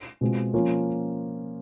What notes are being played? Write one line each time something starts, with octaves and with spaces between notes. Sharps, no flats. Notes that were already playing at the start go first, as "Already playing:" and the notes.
B2 G#3 C4 F4
F3 A#3 C#4 F4